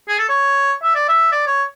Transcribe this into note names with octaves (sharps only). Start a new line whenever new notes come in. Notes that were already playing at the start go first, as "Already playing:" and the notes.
G#4
A4
C#5
E5
D5
E5
D5
C#5